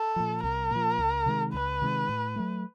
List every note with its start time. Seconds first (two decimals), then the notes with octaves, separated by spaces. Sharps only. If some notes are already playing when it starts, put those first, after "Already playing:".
Already playing: A4
0.16 A#2 F3
0.44 C2 A#4
0.71 A#2 F3
0.99 C#2
1.26 C3 D#3 G#3
1.54 C#2 B4
1.82 C3 D#3 G#3
2.09 A2
2.36 F#3 A3